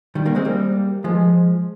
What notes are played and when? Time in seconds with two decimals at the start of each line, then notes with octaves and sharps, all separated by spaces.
0.15 D#3 G3
0.26 G3 A#3
0.35 G#3 C4
0.45 G3 A#3
1.04 F3 G#3